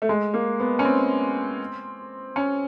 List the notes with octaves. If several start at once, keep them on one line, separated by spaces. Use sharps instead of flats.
A3
G#3
A#3
B3
C#4
C4
C#4